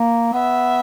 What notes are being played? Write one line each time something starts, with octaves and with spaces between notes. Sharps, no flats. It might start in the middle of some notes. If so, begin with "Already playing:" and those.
Already playing: A#3
B3 E5